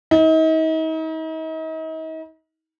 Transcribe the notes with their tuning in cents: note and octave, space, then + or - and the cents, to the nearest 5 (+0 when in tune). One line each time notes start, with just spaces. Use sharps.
D#4 +40